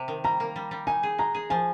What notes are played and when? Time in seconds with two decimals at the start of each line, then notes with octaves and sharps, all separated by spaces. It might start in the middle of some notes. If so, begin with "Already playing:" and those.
Already playing: C3
0.08 D#3
0.24 G3 A#5
0.40 A#3
0.56 G3
0.71 G3
0.87 D#4 G#5
1.03 G#4
1.18 G#3 A#5
1.35 G#4
1.50 F3 G#5